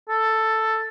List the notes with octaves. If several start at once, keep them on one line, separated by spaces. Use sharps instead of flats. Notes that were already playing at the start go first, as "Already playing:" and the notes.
A4